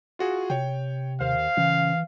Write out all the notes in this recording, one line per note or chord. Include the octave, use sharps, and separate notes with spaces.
F4 F#4 G#4
C3 C#5 G5
D#2 C5 F5
C#3 E3